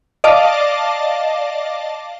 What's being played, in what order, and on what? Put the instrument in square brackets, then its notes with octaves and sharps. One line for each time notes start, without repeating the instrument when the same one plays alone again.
[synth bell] D5 D#5 F5 A5 D6